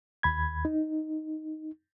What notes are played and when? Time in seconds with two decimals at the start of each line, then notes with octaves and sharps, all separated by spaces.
0.23 D#2 B5 G#6
0.65 D#4